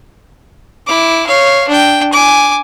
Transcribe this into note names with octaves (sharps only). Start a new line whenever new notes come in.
E4 D6
C#5 F5
D4 G5
G#5 D6